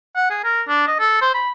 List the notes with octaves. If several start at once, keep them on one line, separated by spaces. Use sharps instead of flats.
F#5
G#4
A#4
D4
D#5
A4
C5
B5